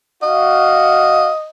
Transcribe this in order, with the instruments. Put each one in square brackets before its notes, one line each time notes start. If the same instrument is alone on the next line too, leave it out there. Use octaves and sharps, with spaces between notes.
[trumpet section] F#4 F5 [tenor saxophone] D#5